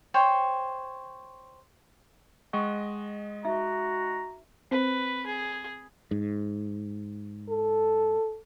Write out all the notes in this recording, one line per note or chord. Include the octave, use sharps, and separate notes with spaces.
C5 C#5 G5
G#3 D#5 F#5 G5 C#6
D#4 F#4 E5 A#5
C4 B4 C5
G#4
G#2
A4